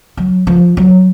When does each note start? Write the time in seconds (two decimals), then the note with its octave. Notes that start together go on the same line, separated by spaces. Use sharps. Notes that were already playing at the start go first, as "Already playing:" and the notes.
0.17 F#3
0.47 F3
0.77 F#3